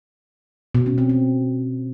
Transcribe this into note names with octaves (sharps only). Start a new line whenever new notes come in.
B2
C#4
C4
C4